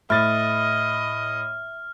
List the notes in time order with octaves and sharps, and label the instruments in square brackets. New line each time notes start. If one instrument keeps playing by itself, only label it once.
[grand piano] A2 A6 [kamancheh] D#5 [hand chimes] E5 [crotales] F6